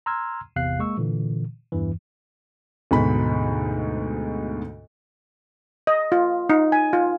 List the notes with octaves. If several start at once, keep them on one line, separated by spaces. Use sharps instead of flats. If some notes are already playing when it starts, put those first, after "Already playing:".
A#5 C6 E6 F6 G#6
G#1 E2 C3 F5 F#6 C7
G#3 A#3 C#6 E6
A#2 D3 E3
E2 G2 E3
D2 G#2 B2 B5
D#5
F4
D#4
G#5
F4